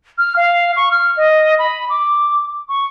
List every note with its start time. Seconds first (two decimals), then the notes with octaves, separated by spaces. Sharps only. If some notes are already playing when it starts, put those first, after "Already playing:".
0.18 F6
0.36 F5
0.76 C#6
0.91 F6
1.17 D#5
1.59 B5
1.90 D6
2.69 C#6